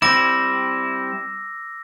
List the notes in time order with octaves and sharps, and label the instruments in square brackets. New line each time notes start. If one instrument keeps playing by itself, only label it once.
[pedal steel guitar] G3 C4 E4 [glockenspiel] D6 E6 A#6